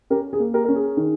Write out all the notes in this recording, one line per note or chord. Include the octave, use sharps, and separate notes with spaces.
C#4 G4 A#4
G#4
A#3
G4 A#4
C#4 A#4
G#4
D#3